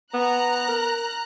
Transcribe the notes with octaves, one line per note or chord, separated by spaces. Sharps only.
B3 A#5 F#6
A#4